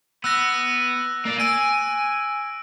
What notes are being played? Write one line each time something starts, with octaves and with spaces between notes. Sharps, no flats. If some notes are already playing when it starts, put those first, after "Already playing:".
B3 E6 F#6 A#6
A#3 D5
G#5 E6 D7